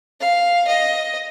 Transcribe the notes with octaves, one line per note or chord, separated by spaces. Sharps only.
F5
D#5